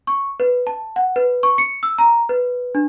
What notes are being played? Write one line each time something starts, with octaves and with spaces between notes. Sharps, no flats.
C#6
B4
A5
F#5
B4
C#6
C#7
E6
A#5
B4
D4